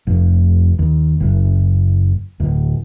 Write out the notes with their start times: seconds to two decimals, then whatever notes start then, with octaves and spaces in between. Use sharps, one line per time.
0.07 F1
0.79 D#2
1.20 F#1
2.40 D1